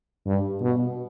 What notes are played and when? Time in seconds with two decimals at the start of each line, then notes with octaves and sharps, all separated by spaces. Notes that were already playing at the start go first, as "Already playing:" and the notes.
0.26 G2
0.62 B2